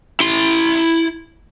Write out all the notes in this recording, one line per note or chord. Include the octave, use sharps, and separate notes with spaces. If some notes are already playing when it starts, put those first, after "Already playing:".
E4 C6